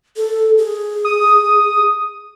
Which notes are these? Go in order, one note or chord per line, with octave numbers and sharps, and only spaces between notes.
A4
G#4
D#6